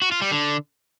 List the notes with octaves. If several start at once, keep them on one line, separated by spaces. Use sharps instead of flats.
F#4
F4
G3
D3